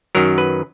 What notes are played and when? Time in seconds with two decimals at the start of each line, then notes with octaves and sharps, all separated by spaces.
0.15 F#2 D#3 F#3 A#4
0.38 B4